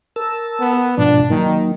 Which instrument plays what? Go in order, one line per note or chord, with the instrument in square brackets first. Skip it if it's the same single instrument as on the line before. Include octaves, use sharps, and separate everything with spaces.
[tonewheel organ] A#4 A5 E6
[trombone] B3
[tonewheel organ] G#2 B2 F3 [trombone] D4
[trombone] D#3 [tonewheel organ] F#3 A#3 D#4